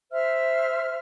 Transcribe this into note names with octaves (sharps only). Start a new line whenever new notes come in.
C5 E5 F6